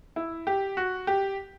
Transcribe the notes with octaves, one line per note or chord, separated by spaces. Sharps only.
E4
G4
F#4
G4